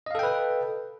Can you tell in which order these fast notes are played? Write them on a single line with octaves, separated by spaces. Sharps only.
D#5 F5 A4 G5 B4